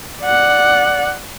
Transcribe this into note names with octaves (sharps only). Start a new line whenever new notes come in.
D5 F#5